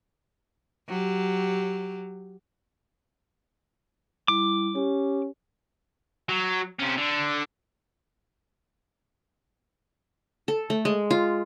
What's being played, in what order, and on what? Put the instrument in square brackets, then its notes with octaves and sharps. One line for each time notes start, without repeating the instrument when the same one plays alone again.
[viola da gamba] F#3 G4
[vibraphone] G3 E4 [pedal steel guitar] D6
[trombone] C#4 [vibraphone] G4
[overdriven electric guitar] F#3
C3 C#4
D3
[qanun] A4
A3
G#3
F4